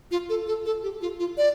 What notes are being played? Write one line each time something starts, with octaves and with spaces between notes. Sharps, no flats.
F4
A4
A4
A4
G4
F4
F4
D5